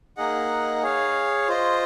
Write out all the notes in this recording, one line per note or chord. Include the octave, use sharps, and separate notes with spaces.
A#3 D#4 G#4 D#5 F#5
G#4 C#5 F5
F4 C5 D#5